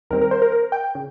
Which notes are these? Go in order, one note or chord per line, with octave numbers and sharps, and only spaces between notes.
D#2 D#3 G3 C4 A#4
A#4
C5
A#4
A#4
G5
C#3